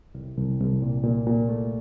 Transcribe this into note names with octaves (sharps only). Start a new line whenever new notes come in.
C2
C2
C2
A#2
A#2
A#2
A3